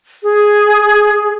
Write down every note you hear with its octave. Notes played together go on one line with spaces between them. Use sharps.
G#4